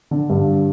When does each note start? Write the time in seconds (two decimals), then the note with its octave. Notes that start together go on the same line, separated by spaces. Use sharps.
0.11 D3
0.30 G2